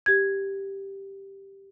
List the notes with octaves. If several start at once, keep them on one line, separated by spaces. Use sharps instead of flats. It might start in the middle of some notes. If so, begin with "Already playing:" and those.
G4 G#6